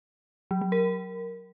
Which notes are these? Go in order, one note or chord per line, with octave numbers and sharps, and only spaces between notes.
F#3
F#3
A#4